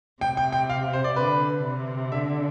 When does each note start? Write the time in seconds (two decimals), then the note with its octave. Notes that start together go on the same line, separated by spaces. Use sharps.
0.21 C3 G5
0.37 G5
0.52 G5
0.70 F5
0.93 C5
1.04 D5
1.16 D3 B4
1.64 C3
2.12 D3 E5